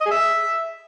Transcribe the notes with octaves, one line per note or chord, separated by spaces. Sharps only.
D#5
G#4
E5